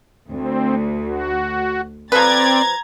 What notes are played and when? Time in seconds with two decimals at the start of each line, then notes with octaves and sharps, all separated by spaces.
0.30 D2 C4
1.04 F#4
2.12 F3 C4 A4 B4 D5 A#5 G#6 A6